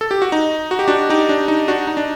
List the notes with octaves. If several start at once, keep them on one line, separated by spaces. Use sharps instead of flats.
A4
G4
F#4
D#4
F#4
G4
D4 F#4
D#4 G4
D4
D#4
D4 F#4
D#4
D4